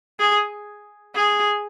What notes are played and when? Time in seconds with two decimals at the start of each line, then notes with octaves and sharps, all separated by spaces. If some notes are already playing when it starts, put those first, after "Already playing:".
0.20 G#4
1.15 G#4